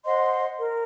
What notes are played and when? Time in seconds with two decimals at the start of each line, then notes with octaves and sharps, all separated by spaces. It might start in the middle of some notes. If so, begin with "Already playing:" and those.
0.05 C5 D#5 F#5 C6
0.58 A#4